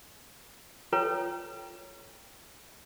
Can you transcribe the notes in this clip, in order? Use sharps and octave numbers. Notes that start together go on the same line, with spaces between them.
F4 A4 B4 C#5 D5 G5